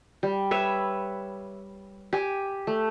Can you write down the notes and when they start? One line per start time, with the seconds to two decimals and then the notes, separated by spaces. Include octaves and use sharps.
0.23 G3
0.51 B4 C#5 E5
2.13 G4 G#5
2.67 A3